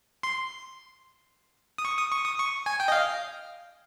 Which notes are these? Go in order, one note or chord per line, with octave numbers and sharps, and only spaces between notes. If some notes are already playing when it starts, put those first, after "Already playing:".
C6
D#6
C#6
D#6
C#6
D#6
C#6
G#5
G5
D#5
F5